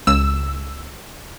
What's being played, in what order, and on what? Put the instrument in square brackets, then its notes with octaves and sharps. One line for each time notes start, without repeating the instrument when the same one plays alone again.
[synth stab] C#2 E6